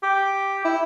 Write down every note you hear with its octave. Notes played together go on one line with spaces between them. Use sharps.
G4
E4